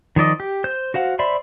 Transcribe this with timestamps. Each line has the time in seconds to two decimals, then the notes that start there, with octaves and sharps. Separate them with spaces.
0.16 D#3 F3 D5 D#5
0.40 G4
0.64 C5 G6
0.94 F#4 C5 F5 F#5
1.19 C5 D5 E5 B5 C6